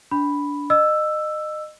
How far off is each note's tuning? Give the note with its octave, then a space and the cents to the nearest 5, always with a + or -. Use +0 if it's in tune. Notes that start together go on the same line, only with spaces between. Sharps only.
D4 -20 B5 +0
D#5 -25 E6 +5